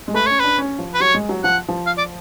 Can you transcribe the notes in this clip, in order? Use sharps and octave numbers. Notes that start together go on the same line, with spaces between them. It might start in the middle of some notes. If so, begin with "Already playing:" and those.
G#3
A3 B4
C#4 C#5
D4 B4
C#4
F3
B4
F#3 C#5
G#3
F#3
F3 F#5
F3
F5
D5